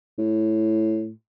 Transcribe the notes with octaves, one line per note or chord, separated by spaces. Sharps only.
A2